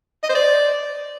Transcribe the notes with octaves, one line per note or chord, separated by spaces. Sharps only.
D#5
C5
D5